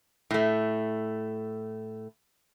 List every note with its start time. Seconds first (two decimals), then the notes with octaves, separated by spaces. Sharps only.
0.31 A2 A3